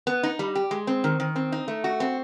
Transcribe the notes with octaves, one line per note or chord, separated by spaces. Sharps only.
B3
D#4
G3
G4
G#3
C4
D#3
D#3
C4
D#4
A3
F#4
C4